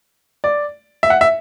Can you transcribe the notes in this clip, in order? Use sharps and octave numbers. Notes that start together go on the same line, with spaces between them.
D5
E5
F#5
E5